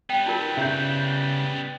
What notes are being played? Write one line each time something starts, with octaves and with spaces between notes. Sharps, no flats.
G3 B3 G5
D#4 F4 A#4
C#3 E4 E5 G6